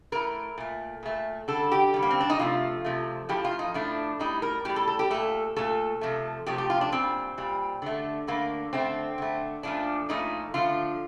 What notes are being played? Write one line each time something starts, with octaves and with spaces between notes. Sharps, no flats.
A2 A3 A#4
A#2 A3
A#2 A3
D3 G3 A4
G4
D3 G3
A#3
C4
D4
D#4
C3 F3 A3 F4
C3 F3 A3
A2 F3 A3 G4
F4
D#4
A2 F3 A3 D4
A2 G3 D#4
A#4
A2 G3 G4
A4
A4
G4
A#2 A3 A4
A#2 A3 A4
C3 F3 A3
C3 F3 A3 G4
G4
F4
D4
A#2 G3 C4
A#2 G3
D3 A3
D3 A3 A#3
D3 A3 C4
D3 A3
A#2 F3 A3 D4
A#2 F3 A3 D#4
D3 F3 A3 F4